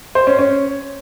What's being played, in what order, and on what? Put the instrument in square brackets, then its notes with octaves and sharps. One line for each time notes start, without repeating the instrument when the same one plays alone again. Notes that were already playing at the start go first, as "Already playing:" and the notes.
[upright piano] C5
C#4
C#4